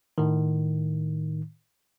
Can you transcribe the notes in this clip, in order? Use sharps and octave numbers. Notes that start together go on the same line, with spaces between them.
A2 D#3